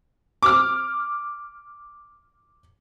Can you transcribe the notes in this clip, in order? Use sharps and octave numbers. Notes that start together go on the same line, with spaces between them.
D6 F6